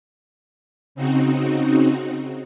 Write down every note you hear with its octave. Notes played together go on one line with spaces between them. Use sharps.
C#3 C4 D#4 F#4